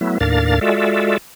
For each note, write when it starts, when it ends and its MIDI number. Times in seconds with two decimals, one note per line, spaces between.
0.01 0.18 54
0.01 0.18 57
0.01 0.18 59
0.01 0.18 64
0.21 0.59 39
0.21 0.59 45
0.21 0.59 62
0.21 0.59 70
0.21 0.59 77
0.21 0.59 93
0.61 1.18 56
0.61 1.18 65
0.61 1.18 66
0.61 1.18 69
0.61 1.18 74
0.61 1.18 76